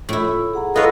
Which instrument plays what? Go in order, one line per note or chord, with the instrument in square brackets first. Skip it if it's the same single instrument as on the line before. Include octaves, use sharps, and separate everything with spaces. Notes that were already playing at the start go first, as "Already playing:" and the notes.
[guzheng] A2 E4 [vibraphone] F4
[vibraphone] G#4 F#5 A#5
[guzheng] E4 C#5 [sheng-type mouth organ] F4 B4 D#5 [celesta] A4